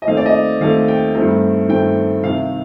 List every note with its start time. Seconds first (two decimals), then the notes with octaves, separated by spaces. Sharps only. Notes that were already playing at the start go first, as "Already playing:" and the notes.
0.02 D#5
0.07 D#2 D#3 A3 C4 F5
0.17 D5
0.26 D#5
0.61 D#2 D#3 A3 C4 F5
0.88 G5
1.15 G2 D#3 A3 C4 A#5
1.68 G2 D#3 A3 C4 G5
2.22 C2 C3 D#3 F5